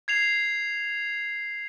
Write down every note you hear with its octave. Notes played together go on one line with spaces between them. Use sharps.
G#6 C7 F7